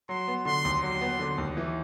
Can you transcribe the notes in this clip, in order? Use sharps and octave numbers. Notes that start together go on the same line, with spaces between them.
F#3 C6
B3
D3 C6
D#2
F#3 C6
B3
D3
D#2
E3